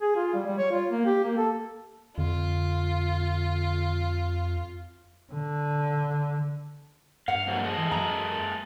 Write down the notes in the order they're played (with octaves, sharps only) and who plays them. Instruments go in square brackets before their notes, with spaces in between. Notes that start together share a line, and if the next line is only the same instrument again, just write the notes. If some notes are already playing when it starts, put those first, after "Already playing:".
[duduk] G#4
F4
G3
G3
C#5
F4
A#3
G4
A#3
A4
[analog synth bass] F2 [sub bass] D3 [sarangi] F4
[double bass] D3
[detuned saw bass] G2 [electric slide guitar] F5 [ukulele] F#5
[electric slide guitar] F2 A#2 F#3
G#3 A4 D#5
[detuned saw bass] E3
[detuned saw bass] F#2 [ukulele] A#5